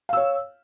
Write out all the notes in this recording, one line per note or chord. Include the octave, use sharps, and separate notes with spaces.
C#5 F5 E6